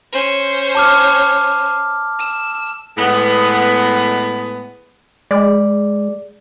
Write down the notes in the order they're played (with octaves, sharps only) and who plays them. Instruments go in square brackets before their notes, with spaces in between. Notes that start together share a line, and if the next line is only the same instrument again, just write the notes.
[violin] C#4 C5
[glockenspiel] A5 D6 F6
[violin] E6
[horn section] A2 G#3 B3
[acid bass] G#3 [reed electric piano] D5